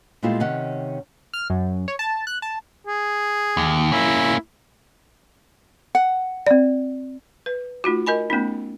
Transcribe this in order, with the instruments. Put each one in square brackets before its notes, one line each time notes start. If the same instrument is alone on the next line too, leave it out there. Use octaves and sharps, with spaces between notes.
[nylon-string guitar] A#2 G#3 A3 E4 F4 G4
C3 D#3 C#4 F#5
[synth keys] F6
F#2
C#5
A5
F#6
A5
[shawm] G#4
[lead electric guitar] D#2
[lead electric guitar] A#3 C#4 [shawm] E4
[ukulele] F#5
[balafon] C4 D5
B4
A3 D#4 F4 F#4
A#4 D#5 G#5 B5
A3 B3 C#4 D#4